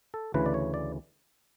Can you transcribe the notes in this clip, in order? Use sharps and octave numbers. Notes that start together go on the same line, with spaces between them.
A4
D2 C#3 E3 B4
D5
C#5
D5